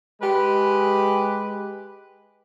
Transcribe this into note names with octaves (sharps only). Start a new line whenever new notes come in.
G#3 G4 B4